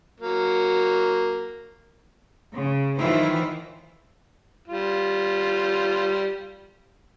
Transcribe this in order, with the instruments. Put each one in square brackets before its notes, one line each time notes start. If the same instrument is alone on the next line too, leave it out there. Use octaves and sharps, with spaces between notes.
[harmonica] F#3 A#3
[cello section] C#3
D#3 E3 F#3 E4 F4 C5
[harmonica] G3 F4